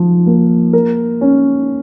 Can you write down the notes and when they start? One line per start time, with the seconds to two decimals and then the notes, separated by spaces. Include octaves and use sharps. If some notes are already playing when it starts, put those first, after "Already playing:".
Already playing: F3
0.26 A#3
0.73 A#4
1.21 C#4